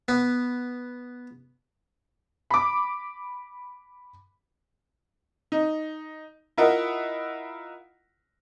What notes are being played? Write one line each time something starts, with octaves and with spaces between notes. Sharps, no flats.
B3
B5 D6
D#4
E4 F4 A#4 D#5 F#5